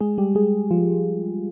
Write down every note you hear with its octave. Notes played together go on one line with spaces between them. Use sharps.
G#3 G#4
G3 G4
G#3 G#4
F3 F4